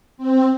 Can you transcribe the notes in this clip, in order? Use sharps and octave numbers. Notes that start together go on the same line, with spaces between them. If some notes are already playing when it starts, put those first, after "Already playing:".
C4